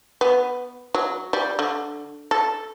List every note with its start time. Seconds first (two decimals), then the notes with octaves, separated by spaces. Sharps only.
0.21 B3
0.94 F#3
1.33 G3
1.59 D3
2.31 A4